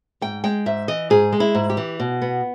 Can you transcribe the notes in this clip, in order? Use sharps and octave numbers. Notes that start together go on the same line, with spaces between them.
G#2 G5
G#3 G5
G#2 E5
E3 D#5
G#2 G#4
G#3
E4
G#2
G4
E3
B2
B3